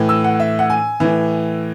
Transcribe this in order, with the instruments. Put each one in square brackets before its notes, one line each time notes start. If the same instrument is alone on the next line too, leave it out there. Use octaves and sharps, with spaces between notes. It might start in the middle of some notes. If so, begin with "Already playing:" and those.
Already playing: [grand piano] A2 E3
E6
F#5
E5
F#5
G#5
A2 E3